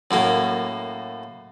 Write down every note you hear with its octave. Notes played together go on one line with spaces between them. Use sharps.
F#2 A2 A#3